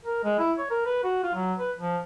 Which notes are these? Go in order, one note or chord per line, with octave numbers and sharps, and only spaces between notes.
A#4
G#3
E4
C#5
A#4
B4
F#4
F4
F#3
B4
F3